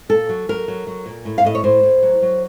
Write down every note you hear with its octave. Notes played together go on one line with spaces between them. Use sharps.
A#2 A4
F#3
F#3 A#4
F#3
F#3
A#2
A2
F5
A2 D#5
C#5
A2 C5
A2
F#3
F#3